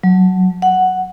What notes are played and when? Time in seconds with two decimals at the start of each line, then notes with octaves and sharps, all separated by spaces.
0.04 F#3
0.62 F#5